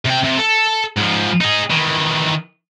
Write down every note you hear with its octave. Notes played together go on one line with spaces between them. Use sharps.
C3 G5
C3
A4
G#2 F3
D#4 G#4
D#3 E3